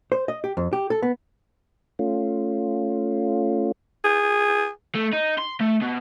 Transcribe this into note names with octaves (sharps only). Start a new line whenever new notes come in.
C5
D#5
G4
F2
G4
A4
B3
A3 C#4 F4
G#4
A3
D#4
C6
A3
B2